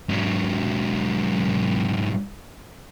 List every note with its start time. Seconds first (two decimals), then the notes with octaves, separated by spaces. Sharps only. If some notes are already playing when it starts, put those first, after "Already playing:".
0.09 G#2 F#3